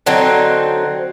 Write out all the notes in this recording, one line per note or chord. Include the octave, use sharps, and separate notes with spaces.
D3 F#3 C4 D#4